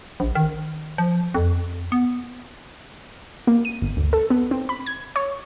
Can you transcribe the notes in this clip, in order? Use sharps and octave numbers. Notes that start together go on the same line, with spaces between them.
A#1
D#3
F3
F2
B3
A#3
D#7
G1
D2
A4
B3
C4
B5
G#6
C#5